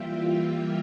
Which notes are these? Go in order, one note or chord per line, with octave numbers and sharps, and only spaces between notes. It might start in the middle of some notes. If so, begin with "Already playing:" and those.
Already playing: E3 G3 A#3 F4 E5 G5